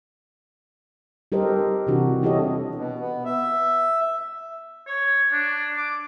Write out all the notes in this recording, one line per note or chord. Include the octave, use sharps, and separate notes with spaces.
G3 G4 A4 A#4 C5 D#5
C3 E3 D4 F#4
E3 E4 G4 A4 C#5 D#5
B2
B3
E5
C#5
D4
D6